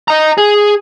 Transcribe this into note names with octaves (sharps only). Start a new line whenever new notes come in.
D#5 A#5
G#4